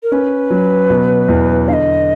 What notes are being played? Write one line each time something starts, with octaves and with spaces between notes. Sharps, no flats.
A#4
C#4 B4
F#3
B2
E2
D3 F5
D#5